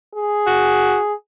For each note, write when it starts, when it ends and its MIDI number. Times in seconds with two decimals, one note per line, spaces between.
0.15 1.13 68
0.47 0.99 66